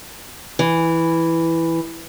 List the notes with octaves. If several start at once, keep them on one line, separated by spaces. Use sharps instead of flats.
E3